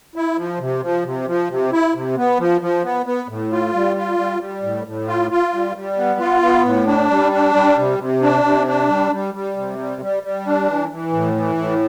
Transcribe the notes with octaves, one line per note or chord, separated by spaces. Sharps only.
E4
F3
C3
F3
C3
F3
C3
E4
C3
B3
F3
F3
B3
B3
A2
F4
G3
F4
G3
G3
A2
A2
F4
F4
G3
G3
B3
F4
B3
A2
D4
G3
D4
G3
C3
C3
D4
C3
D4
G3
G3
G3
C3
G3
G3
G3
D4
E3
E3
A2
E3
A2